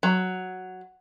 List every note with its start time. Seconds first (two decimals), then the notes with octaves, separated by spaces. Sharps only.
0.03 F#3